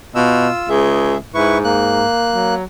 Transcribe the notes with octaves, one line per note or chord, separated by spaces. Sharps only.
B2 F4 E6
C#2 G#4 E5
G#2 E4 B4 C#6
A#3 F#6
F#3